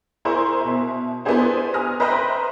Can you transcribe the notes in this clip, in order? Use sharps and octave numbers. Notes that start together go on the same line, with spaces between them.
E4 G#4 A#4 C5 C6 C#6
B2 E5
B3 D4 E4 G4 G#4 C5
G#5 D#6 F6 A#6
B4 C5 D#5 E5 G5 A#5